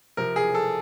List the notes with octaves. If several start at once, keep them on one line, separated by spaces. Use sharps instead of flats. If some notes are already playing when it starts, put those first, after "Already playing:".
C3 F3 A#4
G#4
A4